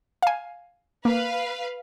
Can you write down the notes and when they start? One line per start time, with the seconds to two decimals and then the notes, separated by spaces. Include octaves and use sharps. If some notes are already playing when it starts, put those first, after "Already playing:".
0.23 F5 G#5
1.05 A#3 B4 F5